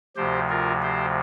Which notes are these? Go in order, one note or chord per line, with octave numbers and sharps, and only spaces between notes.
D2 C3 F3 G4 C5
F4 A#4
G4 C5